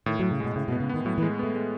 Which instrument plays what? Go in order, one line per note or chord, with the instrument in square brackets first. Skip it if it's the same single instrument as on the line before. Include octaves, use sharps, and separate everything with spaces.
[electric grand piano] A2 [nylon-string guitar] D#3
[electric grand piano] A2 [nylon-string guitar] F#3
[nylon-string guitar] C#3
[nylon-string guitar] B2 [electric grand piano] G#3
[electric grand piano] A2 [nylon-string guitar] C#3
[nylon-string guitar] B2
[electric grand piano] B3
[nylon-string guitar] C#3
[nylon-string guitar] D#3 [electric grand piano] B3
[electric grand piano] A2 [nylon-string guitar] F#3
[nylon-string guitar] E3
[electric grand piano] G#3
[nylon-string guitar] A3 [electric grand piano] B3
[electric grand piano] G#3